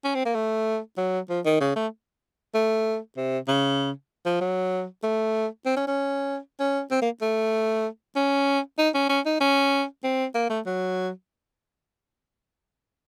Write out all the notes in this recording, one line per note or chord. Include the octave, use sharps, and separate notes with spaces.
C#4
C4
A#3
A3
F#3
F3
D#3
C#3
A3
A3
C3
C#3
F3
F#3
A3
C4
C#4
C#4
C#4
C4
A#3
A3
C#4
D#4
C#4
C#4
D#4
C#4
C4
A#3
A3
F#3